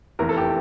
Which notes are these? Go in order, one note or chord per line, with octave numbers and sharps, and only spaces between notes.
F1 E2 E3 A#4
A4
G4